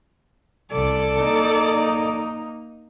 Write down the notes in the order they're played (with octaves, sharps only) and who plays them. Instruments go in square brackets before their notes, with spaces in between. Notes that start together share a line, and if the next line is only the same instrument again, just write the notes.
[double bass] C2 [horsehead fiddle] A4 D5
[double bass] A#3 D#4